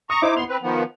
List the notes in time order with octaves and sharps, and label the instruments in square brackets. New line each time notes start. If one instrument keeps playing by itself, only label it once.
[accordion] A#5 C#6 [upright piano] D#6
[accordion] D#4 D6 [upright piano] E4 C5 D#5
[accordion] D#2 B3 C6 [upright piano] F7
[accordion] C4 B4
D#3 F3 B3